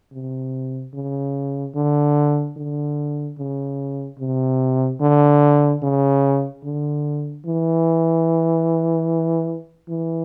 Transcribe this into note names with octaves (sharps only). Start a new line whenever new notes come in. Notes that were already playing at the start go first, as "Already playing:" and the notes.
C3
C#3
D3
D3
C#3
C3
D3
C#3
D3
E3
E3